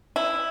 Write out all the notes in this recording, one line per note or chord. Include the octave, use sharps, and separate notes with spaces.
E4